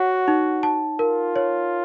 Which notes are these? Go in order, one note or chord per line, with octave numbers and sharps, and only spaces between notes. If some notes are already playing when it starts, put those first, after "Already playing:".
Already playing: F#4 C#5 F#5
D#4
A5
F4 A#4
C#5